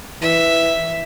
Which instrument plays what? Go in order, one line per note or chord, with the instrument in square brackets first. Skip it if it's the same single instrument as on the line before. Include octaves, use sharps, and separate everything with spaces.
[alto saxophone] E3 [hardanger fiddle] E5